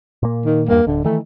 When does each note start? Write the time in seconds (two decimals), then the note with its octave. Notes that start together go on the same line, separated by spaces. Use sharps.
0.23 A#2 A#3
0.45 D#3
0.68 E2 G2 G3 A#3
0.87 D1 D3
1.05 D#3 E3 A3